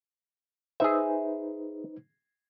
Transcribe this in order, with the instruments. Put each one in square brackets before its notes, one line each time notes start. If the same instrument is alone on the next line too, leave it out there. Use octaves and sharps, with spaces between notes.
[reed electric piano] D#4 B4 C5 [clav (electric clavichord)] G#4 E5